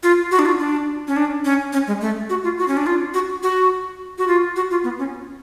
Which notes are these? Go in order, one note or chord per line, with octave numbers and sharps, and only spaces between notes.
F4
F#4
D4
F4
D4
C#4
D4
C#4
C#4
G#3
A3
F#4
F4
F#4
C#4
D4
F4
F#4
F#4
F#4
F4
F#4
F4
B3
C#4